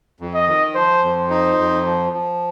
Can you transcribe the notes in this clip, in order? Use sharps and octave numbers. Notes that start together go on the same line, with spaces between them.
F2
D#5
D#3
F3 C5
F2
C5
D#4
F2
F3
F3